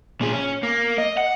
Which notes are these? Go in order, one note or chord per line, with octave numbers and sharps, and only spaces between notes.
A#2 G#4
C#4
A#3
D#5
F#5